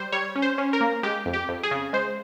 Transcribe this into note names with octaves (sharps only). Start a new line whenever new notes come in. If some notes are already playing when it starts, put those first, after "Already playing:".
Already playing: G3 C5
G3 C#5
C#4
C5
C#4
A#4
A#3
G#3 G4
F2
G4
F2
G#4
C#3
G#3 C5